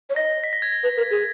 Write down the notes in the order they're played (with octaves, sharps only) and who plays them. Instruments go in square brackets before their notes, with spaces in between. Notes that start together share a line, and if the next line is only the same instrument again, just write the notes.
[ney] C#5
[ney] D#5 [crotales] A#6
[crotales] B6
A#6
G#6
A#6
[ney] B4
A#4
G#4